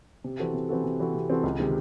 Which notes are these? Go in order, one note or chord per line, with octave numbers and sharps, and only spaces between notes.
C3
E3 C4 F#4 A4
C3
E3 C4 F#4 A4
C3
E3 C4 F#4 A4
C3
E3 C4 F#4 A4
C#2
C3 D#3 G#3